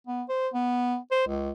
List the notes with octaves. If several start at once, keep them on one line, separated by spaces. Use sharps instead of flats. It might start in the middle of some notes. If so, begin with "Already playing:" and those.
B3
C5
B3
C5
C#2